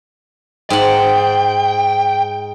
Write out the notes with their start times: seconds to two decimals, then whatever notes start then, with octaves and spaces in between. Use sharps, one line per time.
0.70 G#2 F#5 G5